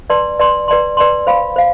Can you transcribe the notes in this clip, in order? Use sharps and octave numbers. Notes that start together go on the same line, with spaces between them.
B4 D5 A5 C6
B4 D5 A5 C6
B4 D5 A5 C6
B4 D5 A5 C6
C5 F5 B5
C5 F5